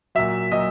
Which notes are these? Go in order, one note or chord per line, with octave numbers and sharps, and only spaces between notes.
A#2 F#3 E5
A#2 F#3 D#5